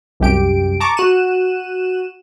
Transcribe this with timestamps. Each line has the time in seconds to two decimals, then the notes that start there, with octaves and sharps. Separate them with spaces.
0.20 C2 F#2 G4 D7
0.80 A5 A#5 C#6 D6
0.97 F#4 F#6 D#7 E7